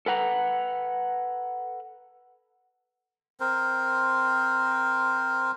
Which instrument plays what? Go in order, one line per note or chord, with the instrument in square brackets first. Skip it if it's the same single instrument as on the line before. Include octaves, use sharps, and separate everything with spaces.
[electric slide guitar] A4 B4 F#5 A#5
[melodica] C4 A#4 C5